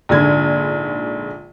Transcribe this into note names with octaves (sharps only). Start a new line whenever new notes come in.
A#1 G#2 D3 G#6